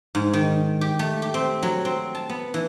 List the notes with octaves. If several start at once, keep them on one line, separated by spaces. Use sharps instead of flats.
G#2
D#3
G4
A3
G4
C4
F#3
C4
A5
B3
E3